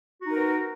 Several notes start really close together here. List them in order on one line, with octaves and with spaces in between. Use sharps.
F#4 D#4 A#4 B3